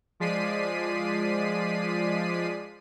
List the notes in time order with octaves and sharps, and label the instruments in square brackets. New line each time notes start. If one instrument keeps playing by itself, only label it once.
[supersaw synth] F3 G#3 D5 B6 C7 D#7